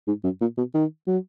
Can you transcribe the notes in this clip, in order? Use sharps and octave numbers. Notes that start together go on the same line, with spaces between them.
G#2
F#2
A#2
B2
D#3
F#3